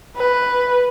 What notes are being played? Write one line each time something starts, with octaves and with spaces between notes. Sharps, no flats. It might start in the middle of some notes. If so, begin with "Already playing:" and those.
B4